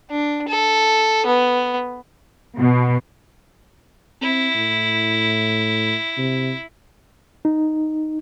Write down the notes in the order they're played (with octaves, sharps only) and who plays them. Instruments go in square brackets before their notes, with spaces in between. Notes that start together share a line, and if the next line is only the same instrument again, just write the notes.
[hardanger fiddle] D4
A4
B3
[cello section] B2
[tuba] C4 [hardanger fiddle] E4
[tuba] A2
C3
[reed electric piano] D#4